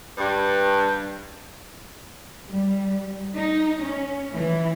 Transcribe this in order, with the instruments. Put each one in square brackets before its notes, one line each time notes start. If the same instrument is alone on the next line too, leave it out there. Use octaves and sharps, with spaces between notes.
[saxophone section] G2
[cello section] G3
D#4
C#4
E3